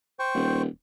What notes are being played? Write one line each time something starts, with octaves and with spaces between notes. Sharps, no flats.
C5 G5 C#6
D#1